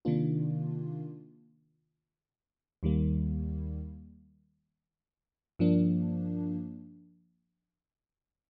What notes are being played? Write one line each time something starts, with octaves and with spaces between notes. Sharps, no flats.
C3 D#3 A#3 D4 F4
D#2 D#3 G3 A#3
G2 F3 A#3 D4